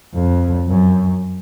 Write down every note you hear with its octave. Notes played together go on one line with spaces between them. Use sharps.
F2
F#2